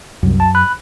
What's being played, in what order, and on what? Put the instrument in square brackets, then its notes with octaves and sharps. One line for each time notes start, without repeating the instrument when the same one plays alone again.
[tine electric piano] C2 [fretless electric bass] F#2
[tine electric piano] A5
B5 F#6